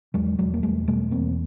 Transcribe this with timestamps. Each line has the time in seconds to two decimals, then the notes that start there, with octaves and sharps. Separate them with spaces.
0.14 E2 F#3 G#3
0.39 E1 F#3 G#3
0.54 A#3
0.63 E1 G3 A3
0.87 B2 G3 A3
1.11 E2 A#3 C4